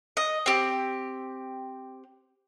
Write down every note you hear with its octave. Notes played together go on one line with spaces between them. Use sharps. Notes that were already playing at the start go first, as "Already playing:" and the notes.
D#5
C4 G4